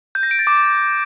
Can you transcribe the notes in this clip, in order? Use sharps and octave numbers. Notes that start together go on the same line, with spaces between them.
G6
A#6
D7
A6
D6